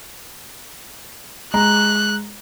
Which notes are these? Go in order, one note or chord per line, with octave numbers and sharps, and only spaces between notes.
G#3 A#5 F#6